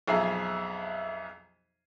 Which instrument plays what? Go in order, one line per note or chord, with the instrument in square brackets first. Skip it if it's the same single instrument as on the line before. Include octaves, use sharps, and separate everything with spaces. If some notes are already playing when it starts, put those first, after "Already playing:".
[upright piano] B1 F2 G#4 E5 A#5 C7